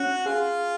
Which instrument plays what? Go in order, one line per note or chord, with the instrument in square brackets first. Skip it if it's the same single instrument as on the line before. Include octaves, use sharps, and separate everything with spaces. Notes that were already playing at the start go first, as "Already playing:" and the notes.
Already playing: [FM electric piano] C#4 [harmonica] F#4 F#5
[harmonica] F4 F5 [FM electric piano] G#4